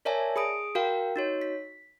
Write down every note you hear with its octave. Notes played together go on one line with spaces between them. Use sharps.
A#4 C#5 D5 E5 G#5 A5
G#4 B5 D#6 D7
F#4 A#4 F5 G5
D#4 F#4 C#5
B6